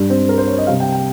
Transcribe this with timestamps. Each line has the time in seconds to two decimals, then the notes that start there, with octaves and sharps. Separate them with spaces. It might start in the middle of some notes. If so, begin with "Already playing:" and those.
Already playing: G2 G3
0.10 C4
0.29 A#4
0.38 C5
0.47 C#5
0.58 D#5
0.67 C3 G3 F5
0.80 G5
0.92 G5